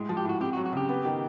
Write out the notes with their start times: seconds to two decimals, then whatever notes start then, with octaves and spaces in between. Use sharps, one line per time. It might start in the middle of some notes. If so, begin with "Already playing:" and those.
Already playing: A2 G#3
0.09 F3
0.17 G4
0.25 A2 F#4
0.41 C4 G4
0.53 F#4
0.57 F#3
0.66 F#4
0.73 C#3 G4
0.89 B3
1.05 D#3